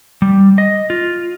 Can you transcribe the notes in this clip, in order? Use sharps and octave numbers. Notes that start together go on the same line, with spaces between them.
G3
D#5
F4